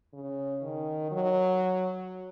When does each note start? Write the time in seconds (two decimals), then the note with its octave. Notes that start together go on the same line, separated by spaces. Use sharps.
0.14 C#3
0.63 D#3
1.11 F#3